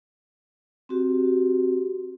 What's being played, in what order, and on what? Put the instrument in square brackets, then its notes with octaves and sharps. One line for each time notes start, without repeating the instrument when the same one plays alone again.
[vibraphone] C4 F#4 G4